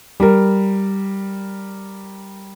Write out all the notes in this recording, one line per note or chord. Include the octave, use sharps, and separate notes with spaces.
G3 A#4